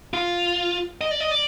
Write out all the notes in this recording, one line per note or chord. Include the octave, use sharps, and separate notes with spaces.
F4
D#5
D5
D#5
D5